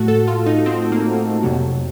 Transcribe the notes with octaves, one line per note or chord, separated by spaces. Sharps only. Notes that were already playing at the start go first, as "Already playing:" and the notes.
Already playing: A2 A3 F#4
A4
F4
D#4
C4
A#3
F2 C3 F#3